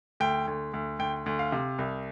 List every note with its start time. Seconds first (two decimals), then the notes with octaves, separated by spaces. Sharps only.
0.20 D2 G5
0.47 D2
0.73 D2
0.99 D2 G5
1.26 D2
1.39 F5
1.52 C3
1.79 C2